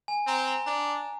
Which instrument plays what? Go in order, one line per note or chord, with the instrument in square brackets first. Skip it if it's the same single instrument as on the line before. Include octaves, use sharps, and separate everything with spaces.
[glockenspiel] G#5
[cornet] C4 [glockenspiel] A#5
[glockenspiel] A#5
[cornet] D4 [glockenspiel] A#5